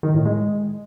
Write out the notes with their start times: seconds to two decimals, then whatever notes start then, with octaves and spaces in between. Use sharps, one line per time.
0.03 D#3
0.14 A2
0.26 G#3